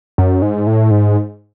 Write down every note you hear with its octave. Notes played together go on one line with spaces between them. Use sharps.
F#2
G#2
A2
G#2